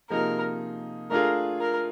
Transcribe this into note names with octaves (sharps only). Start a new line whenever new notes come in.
C3 F3 A#3 D#4 G#4 A#4
A3 D4 F4 G#4 A#4
A#4